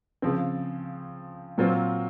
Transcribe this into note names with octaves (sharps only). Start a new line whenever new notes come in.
C#3 F3 C4
A#2 F#3 C4 F4 C5